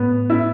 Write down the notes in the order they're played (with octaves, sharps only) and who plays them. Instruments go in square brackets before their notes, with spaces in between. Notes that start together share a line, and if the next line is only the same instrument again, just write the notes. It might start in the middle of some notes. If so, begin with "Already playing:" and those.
Already playing: [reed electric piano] A2 [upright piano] B3
[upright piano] E4